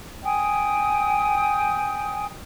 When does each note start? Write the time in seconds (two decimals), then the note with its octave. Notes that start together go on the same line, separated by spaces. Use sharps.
0.24 G5 G#5 D#6